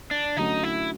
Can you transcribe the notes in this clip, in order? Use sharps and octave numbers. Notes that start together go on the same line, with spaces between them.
D4
D3 F#3 A3 C#4 D#4
E4